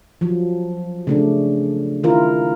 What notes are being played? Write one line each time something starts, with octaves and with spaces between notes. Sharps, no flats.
F3 F#3
C#3 A3 D4
D#3 E4 F4 A#4